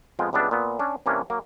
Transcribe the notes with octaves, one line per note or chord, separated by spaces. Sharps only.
F2 G#3 B3 F4 G5
C#2 G3 B3 D4 E5
A#2 B3
C#4 D4
C3 E3 A#3 C#4 D4
F#3 A#3